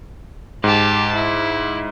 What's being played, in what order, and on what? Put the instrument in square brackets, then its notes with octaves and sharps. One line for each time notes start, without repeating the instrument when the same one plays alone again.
[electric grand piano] G#2 [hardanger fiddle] G4 A5
[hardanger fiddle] E4